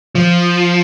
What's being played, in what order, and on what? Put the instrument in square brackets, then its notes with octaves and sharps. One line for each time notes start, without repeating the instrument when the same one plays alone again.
[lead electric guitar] F3